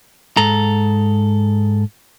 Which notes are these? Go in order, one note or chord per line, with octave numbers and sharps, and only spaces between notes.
G#2 A4 A#5